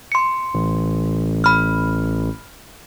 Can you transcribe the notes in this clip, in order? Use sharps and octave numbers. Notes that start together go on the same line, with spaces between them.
C6 C#7
A1
B5 F6